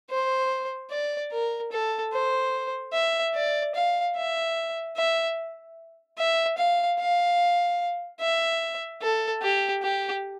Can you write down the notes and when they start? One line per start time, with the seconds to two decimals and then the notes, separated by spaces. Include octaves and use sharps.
0.10 C5
0.91 D5
1.32 A#4
1.72 A4
2.13 C5
2.93 E5
3.35 D5
3.75 F5
4.16 E5
4.97 E5
6.18 E5
6.58 F5
6.99 F5
8.20 E5
9.02 A4
9.42 G4
9.83 G4